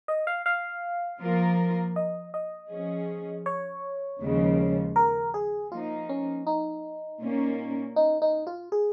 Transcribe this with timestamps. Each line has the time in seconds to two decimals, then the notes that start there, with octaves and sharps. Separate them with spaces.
0.08 D#5
0.27 F5
0.46 F5
1.21 F3 A#3 F4 A#4
1.96 D#5
2.34 D#5
2.71 F3 C#4 G#4
3.46 C#5
4.21 D#2 C#3 F3 G#3
4.96 A#4
5.34 G#4
5.71 F3 A#3 D#4 F4
6.09 C#4
6.47 D#4
7.22 A#2 A#3 C#4
7.96 D#4
8.22 D#4
8.47 F4
8.72 G#4